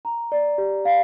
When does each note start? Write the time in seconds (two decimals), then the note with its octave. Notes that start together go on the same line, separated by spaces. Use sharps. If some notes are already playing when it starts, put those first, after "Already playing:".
0.05 A#5
0.32 D5
0.58 G4
0.85 F5